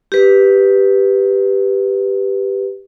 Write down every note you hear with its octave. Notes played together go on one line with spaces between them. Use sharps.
G4 B4